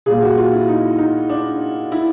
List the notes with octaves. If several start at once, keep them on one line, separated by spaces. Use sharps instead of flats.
A#2 G3 A#3 G#4
F#4
F4
E4
D#4
D#4
D4
E4